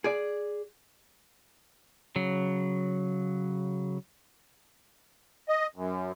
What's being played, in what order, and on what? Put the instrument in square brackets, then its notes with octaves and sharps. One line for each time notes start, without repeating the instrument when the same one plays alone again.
[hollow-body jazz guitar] G#4 D5
[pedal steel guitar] C#3 F#3
[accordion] D#5
F#2